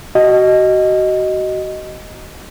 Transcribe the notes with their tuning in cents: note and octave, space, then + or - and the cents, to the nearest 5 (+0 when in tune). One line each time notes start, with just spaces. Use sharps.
F#4 +30 D#5 +0